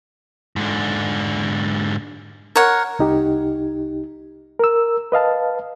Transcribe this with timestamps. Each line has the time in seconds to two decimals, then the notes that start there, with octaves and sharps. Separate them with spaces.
0.56 G#2 D3
2.56 A#4 C#5 F#5
2.99 C2 D#4 G4
4.59 A#4 E6
5.12 B4 D#5 F5 A5